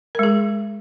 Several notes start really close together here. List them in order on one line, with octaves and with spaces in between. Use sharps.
A#4 G#3 G#4